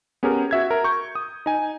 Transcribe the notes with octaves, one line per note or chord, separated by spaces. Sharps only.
B3 C#4 G4 G#4 A#4
F#4 E5 G#6
A#4
C#6 G6
D#6
D#4 G#5